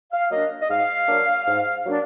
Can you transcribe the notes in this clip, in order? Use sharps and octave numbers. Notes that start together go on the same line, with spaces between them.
F5
F#3 A#3 D4 D#5
D#5
G#2 F5
F#3 A#3 D4
G#2
F#3 A#3 D4